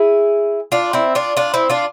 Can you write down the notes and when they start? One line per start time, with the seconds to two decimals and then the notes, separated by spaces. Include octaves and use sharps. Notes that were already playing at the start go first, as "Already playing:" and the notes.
Already playing: E4 G#4
0.72 D4 F4
0.93 C4 E4
1.15 D4 F4
1.37 D4 F4
1.54 C4 E4
1.70 D4 F4